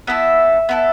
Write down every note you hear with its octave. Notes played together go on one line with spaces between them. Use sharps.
B3 E4 A4 E5
B3 E4 A4